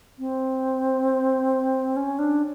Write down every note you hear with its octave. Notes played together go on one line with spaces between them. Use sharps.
C4
C#4
D4